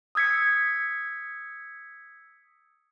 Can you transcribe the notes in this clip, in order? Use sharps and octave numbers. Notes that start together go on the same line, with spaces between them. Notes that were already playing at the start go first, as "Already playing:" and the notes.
D#6 E6 G#6 B6 C#7